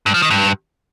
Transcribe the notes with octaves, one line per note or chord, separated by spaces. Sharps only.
G2
F3
D#3
G2